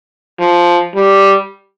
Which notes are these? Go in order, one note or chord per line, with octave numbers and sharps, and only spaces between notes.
F3
G3